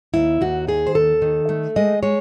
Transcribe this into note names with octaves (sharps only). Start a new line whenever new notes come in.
D#2 E4
D#2 F#4
D#3 G#4
C5
D#2 A4
D#3
A3
G#3 D#5
G#3 C#5